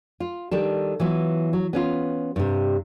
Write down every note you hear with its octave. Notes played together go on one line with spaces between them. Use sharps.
F4
D#3 G3 D4 A4
E3 F#3 B3 F4
F#3
B3 C#4 F4
G2 C3